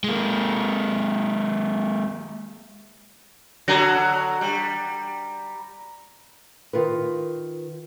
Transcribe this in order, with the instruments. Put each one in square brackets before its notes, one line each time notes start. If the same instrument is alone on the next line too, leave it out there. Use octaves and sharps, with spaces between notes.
[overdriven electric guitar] G#3 A#3
[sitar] D3 F#3 [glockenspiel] A#5 A#6
[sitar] G3
[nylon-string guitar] D#3 F4 A#4 B4